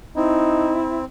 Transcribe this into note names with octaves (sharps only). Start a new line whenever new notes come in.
C4 D#4 E4